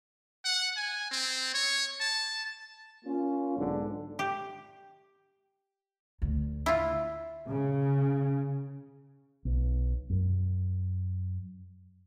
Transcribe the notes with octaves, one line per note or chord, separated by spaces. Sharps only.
F#5
G#5
C4
C#5
A5
A#3 C#4 F4
B1 G#2 D3
G4
D2
E4 F4
C#3
B1
F#2